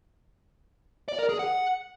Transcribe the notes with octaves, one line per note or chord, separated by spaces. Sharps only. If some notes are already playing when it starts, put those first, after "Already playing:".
D5
A#4
G#4
F#5